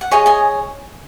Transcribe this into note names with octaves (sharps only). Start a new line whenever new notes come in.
F#5
G#4 C#5 D#5 G#5
D#5 G#5